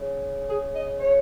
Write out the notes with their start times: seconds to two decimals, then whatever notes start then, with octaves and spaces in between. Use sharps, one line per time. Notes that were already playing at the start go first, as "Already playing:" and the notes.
Already playing: C#3
0.50 G#4
0.75 D#5
1.00 C#5